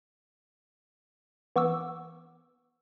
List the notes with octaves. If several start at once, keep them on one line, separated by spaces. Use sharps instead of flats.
E3 B3 C#6 D6 E6